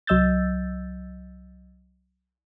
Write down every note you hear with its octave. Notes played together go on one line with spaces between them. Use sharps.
C2 F#3 D#5 E6 G6 A6